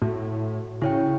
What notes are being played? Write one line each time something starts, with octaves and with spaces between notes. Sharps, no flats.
A2 F#4
C#3 E4 C#5 G5